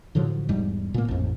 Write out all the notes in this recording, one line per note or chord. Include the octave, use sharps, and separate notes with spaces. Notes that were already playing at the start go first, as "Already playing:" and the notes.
A2 D3 F3 F#3
E1 G#2 G3
A#2 A#3
A1 F2